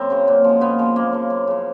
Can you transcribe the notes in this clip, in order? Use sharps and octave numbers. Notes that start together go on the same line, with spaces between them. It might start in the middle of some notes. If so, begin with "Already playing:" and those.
Already playing: F#2 C4
C#3 F#3
A#2
F3 G#3
A#2 B3
F3 G#3
F#2 A#3
C#3 F3
F#2
C#3 F3